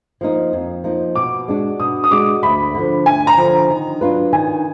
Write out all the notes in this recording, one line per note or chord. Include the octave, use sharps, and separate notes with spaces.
F3 A#3 D#4
F2
F3 A#3 D#4
B2 D6
G#3 D4 F#4
B2 D#6
D#6
G#3 D4 F#4 D6
D2 B5
D3 F3
D2 G#5
A#5
D3 F3
D#3
F#3 D4 F4 B4
D#3 G#5